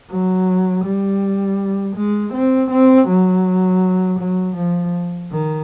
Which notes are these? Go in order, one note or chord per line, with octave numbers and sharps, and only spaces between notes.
F#3
G3
G#3
C4
C4
F#3
F#3
F3
D#3